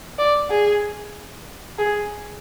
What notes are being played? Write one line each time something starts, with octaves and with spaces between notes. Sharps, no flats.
D5
G#4
G#4